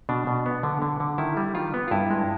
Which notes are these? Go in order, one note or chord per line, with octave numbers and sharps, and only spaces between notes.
B2 D4
B2
B3
D3
D3
D3
D#3 E4
G3
D#3 F4
B3
F4
G2 E4
G#3